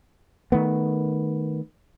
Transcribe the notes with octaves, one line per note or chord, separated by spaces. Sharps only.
D#3 A3 B3